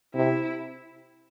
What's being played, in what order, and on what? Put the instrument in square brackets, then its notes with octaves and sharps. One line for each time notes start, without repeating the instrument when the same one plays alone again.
[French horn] C3 [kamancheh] E4